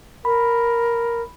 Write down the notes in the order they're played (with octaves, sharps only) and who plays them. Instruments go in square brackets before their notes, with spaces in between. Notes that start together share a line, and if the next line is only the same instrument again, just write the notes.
[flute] A#4 [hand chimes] B5